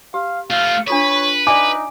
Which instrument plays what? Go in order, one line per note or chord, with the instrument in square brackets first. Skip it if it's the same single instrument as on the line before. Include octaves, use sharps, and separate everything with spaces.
[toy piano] G4 [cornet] F5
[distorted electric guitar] A3 F4 [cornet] F5
[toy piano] D4 F4 A4 [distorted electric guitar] B4 [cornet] C#5
[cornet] D#4 [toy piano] D5 E5 G#5 [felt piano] D6